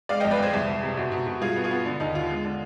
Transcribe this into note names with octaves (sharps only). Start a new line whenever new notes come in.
G#3 D5 F5
D#5 G5
F2
B4 D5
F2 G#4 C5
C2
C2
C3
B2
B2
B2
G2 F4 G#4
B3
F4 G#4
B3
D3
D#2 D#4
D#2 F4
G#3
D3